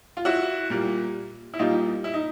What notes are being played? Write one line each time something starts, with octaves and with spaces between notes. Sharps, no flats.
F4
E4 F#4
A#2 G3 A#3
E4
A#2 G3 A#3 D#4 F4
E4
D#4